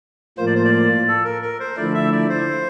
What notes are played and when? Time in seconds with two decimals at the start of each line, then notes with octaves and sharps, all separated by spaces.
0.38 A2 F3 A#3 F4 C5
0.46 D5
0.55 C5
0.65 D5
1.08 A4
1.24 A#4
1.42 A#4
1.60 C5
1.77 D3 F3 A3 E4 D5
1.94 E5
2.12 D5
2.30 C5